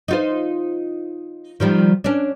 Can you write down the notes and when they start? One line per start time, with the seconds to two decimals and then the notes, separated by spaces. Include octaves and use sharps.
0.08 D#4 F4 C5
1.60 D#3 F3 G3
2.04 C#4 D4